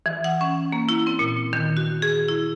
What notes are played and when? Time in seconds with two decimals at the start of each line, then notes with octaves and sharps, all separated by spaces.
0.06 E3
0.24 F#5
0.41 C#4
0.72 A#3
0.89 E4
1.07 C4
1.19 A#2
1.53 D#3
1.77 F#4
2.02 G#4
2.28 E4